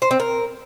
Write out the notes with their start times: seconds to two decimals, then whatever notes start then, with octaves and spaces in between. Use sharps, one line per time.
0.02 C5
0.11 C4
0.20 A#4